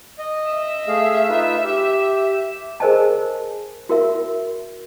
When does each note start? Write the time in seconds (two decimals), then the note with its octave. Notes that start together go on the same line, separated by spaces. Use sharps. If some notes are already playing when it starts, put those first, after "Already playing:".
0.18 D#5
0.48 E5
0.88 A3 G#4 F5
1.29 D#4 F4 B4
1.64 G4
2.80 G#4 A#4 C5 D#5 G#5 A5
3.89 F#4 A#4 E5